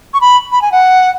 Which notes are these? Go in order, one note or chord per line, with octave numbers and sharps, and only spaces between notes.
C#6
B5
B5
G#5
F#5